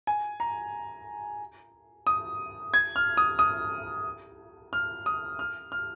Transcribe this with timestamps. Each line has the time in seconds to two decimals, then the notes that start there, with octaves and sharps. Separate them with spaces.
0.07 G#5
0.40 A#5
2.07 D#6
2.74 G#6
2.96 F6
3.17 D#6
3.39 D#6
4.73 F6
5.06 D#6
5.39 F6
5.72 F6